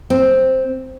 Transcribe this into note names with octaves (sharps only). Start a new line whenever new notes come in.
C4